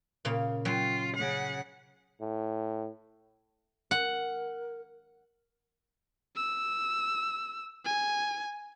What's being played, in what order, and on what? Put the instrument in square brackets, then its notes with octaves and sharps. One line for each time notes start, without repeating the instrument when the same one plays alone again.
[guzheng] A#2 C#3 F5
[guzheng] F#3 C#4 G5 [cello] F4
[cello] C#3 F#5
[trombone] A2
[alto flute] A#4 [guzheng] F#5
[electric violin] E6
G#5